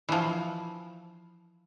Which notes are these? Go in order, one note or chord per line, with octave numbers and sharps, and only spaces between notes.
E3 F3